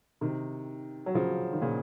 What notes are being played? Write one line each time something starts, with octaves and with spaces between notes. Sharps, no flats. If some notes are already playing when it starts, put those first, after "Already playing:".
C3 D#3
F#3
C#3 F3
D#3
A#2 C#3